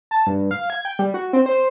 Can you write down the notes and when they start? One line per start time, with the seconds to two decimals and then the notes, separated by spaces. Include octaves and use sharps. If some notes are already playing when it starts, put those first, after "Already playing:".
0.11 A5
0.27 G2
0.51 F5
0.70 G#6
0.85 G5
0.99 G3
1.14 F#4
1.33 C4
1.46 C5